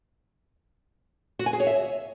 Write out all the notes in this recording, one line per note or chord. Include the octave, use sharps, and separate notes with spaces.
F#4
G#5
G#4
C#5
E5